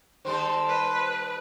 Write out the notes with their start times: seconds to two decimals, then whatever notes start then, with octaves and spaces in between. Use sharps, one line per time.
0.25 D#3 G3 A4 C5
0.68 B4